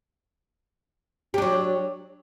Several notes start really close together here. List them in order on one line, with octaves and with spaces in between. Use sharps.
G4 D4 F#3